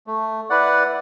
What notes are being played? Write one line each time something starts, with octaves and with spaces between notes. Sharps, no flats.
A3
E4 B4 D5 F#5